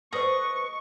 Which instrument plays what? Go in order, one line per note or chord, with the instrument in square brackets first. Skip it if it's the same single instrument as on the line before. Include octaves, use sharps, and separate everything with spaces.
[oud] A4 C5 D5 [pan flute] B4 [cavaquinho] D#5 [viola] C#6